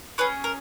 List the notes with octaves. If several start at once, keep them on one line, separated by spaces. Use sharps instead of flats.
C#4 G#4 B4
A#4